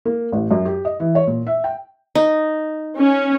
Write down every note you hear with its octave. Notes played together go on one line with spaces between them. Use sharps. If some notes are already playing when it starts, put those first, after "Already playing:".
A#3
A1
F#2
G4
D#5
E3
C#5
A#2
E5
G5
D#4
C#4